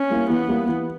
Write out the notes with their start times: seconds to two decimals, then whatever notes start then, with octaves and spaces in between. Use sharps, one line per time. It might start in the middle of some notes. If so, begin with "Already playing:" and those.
Already playing: C#4
0.10 G3 A#3 E4 G4
0.30 E3 B3
0.49 G3 A#3 E4 G4
0.69 E3